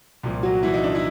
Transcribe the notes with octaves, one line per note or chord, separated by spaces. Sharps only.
C2 A#2 F3
F#3 F#4
E3 E4
D#4
D4
E4